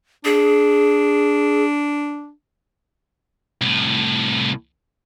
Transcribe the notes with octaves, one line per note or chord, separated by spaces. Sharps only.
D4 G#4
C2 A2